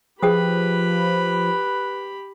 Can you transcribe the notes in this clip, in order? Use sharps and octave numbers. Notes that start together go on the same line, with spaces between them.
F3 G4 G#4 B4 G5 B5 D#6